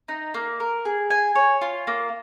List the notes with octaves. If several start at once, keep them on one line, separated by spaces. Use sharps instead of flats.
D#4
A#3
A#4
G#4
G#5
C#5
F4
A#3